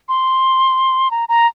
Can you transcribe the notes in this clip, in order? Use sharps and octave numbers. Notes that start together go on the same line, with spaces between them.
C6
A#5
A#5